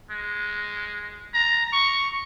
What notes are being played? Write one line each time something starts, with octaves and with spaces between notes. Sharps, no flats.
G#3
A#5
C#6